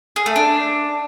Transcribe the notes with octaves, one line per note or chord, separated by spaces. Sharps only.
G#4
A3
D4